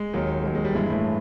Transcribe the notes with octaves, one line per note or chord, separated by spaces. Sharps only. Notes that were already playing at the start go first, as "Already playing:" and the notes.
Already playing: G#3
D#2 D#3 F#3
D#2 D#3 F#3 G#3
G#3
G3
G2 E3 G#3
A2 A3